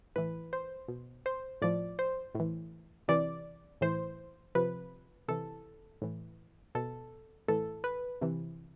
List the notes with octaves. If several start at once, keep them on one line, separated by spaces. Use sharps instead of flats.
A2 E3 B4
C5
B2
C5
A2 F3 D5
C5
A2
E3
C3 E3 D5
A2 E3 C5
C3 F3 B4
C3 E3 A4
A2 E3
B2 A4
A2 E3 A4
B4
C3 E3